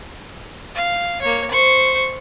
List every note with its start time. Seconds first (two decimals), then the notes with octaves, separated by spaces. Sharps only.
0.75 F5
1.21 A#3 C#5
1.51 C5 C#6